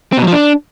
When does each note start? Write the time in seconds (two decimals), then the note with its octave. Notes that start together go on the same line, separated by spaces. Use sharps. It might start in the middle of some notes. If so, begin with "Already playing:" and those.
0.12 C4
0.17 B2
0.22 F#3
0.28 F3
0.33 D4